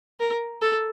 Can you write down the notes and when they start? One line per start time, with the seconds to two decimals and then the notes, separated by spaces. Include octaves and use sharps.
0.20 A#4
0.61 A4